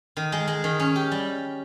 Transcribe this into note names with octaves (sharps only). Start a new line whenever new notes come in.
D#3
G#3
G#3
D#3
C#4
G4
G3